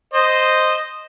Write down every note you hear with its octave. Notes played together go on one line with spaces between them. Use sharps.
C5 D#5